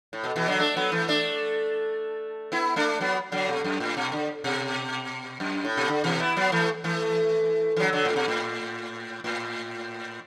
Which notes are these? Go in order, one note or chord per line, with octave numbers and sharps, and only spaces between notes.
A2
B2
B2 E3
D3 F#3
A3 D4
F#3 B3
E3 A3
A3 D4
B3 E4
A3 D4
F#3 B3
D3 F#3
B2
F#2
A2
B2
D3
B2
F#2
A2
B2
D3
B2 E3
B3 E4
F#3 B3
E3 A3
E3 A3
E3
D3 F#3
D3 F#3
A2
B2
A2
A2